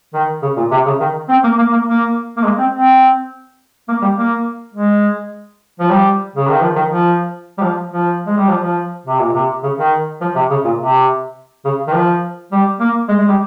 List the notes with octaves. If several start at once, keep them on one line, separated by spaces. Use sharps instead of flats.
D#3
C#3
A#2
C3
C#3
D#3
C4
A#3
A#3
A#3
A#3
A#3
G#3
C4
C4
A#3
G3
A#3
G#3
F3
G3
C#3
D#3
F3
D#3
F3
G3
F3
F3
G#3
G3
F3
F3
C3
A#2
C3
C#3
D#3
F3
C3
C#3
A#2
C3
C#3
D#3
F3
G3
A#3
G#3
G#3
G3